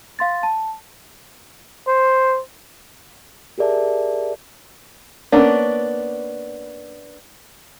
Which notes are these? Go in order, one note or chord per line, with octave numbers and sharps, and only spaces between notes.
F5 C6 A6
A5
C5
G4 G#4 A#4 D5 E5 A5
A#3 B3 C#4 D4